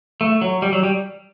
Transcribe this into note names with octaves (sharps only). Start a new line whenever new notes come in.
A3
F#3
G3
F#3
G3